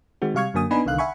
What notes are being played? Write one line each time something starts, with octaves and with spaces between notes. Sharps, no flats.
D#3 G#3 C4 F#4
C3 G3 F5 C#6 F6 G#6
F#2 D3 F#3 A#3 G#5 D#6
B3 D4 D#4 B4 G#5 B5
C2 D3 D#3 F5 F#6
E5 F#5 G#5 B5 C#6